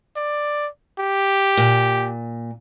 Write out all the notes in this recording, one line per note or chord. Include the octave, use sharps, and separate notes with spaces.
D5
G4
A#2